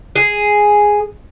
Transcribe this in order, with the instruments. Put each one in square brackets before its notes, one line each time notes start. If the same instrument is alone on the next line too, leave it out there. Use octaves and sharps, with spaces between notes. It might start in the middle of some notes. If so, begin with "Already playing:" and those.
[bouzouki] G#4